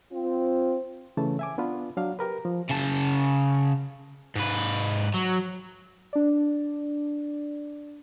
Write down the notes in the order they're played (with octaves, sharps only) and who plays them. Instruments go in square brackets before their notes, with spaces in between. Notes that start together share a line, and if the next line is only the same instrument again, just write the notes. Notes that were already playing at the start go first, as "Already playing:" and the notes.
[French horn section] C4 F4
[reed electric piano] C#3 E3 A3 A5
E5 G#5 D6
B3 D4 F4 B4
F#3 D4 F5
G4 A#4 B4
F3
[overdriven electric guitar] C#3 A5
G#2 B4
F#3
[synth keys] D4 D5